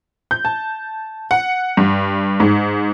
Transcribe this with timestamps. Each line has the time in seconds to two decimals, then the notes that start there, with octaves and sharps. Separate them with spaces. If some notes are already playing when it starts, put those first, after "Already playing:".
0.31 G6
0.45 A5
1.31 F#5
1.77 G2
2.40 G#2